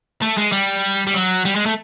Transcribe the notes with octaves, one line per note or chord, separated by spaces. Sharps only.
A3
G#3
G3
G3
F#3
G3
G#3
A3